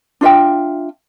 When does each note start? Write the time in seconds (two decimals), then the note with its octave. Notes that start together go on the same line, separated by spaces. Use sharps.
0.21 D4 F4 E5 G5